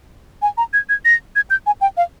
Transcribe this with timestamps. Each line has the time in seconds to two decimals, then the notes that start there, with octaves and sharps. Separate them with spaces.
0.42 G#5
0.57 A#5
0.73 G#6
0.89 G#6
1.05 A#6
1.36 G#6
1.50 G6
1.66 G#5
1.81 G5
1.97 F5